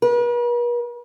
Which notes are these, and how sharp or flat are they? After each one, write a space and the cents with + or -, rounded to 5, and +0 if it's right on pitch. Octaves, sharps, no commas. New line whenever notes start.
B4 -45